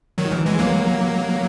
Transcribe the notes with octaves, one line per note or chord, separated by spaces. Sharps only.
D#3 F#3
E3
E3 G#3
F#3 A#3